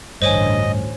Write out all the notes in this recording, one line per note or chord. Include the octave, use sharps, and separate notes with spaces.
A1 D2 G2 C5 C#5 D#5 G#5